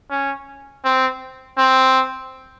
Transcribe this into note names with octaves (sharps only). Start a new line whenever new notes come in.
C#4
C4
C4